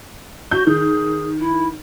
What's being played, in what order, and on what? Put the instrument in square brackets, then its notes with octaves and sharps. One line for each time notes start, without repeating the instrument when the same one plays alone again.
[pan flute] F#4 [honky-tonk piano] G6
[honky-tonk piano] D#3 [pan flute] G#4
[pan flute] E4